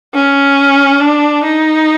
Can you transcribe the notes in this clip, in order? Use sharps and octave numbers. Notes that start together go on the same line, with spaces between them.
C#4
D4
D#4